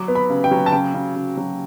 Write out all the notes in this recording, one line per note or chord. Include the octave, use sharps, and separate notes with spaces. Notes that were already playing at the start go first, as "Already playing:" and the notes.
Already playing: F#3 D6
B3
B5
C#3
G5
F#3
A5
C#3 G5
C#3
C#3
F#3